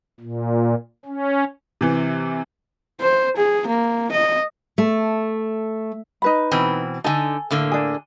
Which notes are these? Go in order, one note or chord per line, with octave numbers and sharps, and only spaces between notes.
A#2
C#4
C3 E3
C5
G#4
A#3
D#5
A3
D#4 B4 B5
B2 E3 C4
D3 D#4 A4 G#5
A2 D3 A#3
D4 G#4